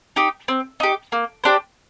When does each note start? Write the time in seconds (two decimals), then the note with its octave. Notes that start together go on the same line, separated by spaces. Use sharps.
0.16 D#4 G4
0.48 C4
0.80 D#4 G4
1.12 A#3
1.44 D4 G4 C5